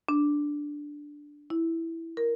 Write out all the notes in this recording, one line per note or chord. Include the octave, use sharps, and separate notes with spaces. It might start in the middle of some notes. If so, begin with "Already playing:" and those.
D4
E4
A#4